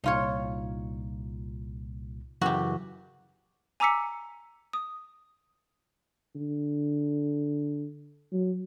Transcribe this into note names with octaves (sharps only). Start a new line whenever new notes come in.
C2 A#2 D#4 F4 C#5
F#2 C#3 E3 F#4 G4
G#5 A#5 D6 E6 B6 C#7
D#6
D3
F#3